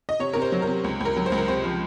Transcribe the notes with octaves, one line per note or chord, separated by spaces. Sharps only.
D#5
C3 C#5
C3 A#4
C5
F#3
A#4
C3
C#2
C#2 A#4
F#3
C5
C#2
A#4
C3 C5
F3